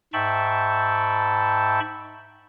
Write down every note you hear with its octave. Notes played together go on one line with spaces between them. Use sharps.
G#2 E5 G5 A5 B5 C#6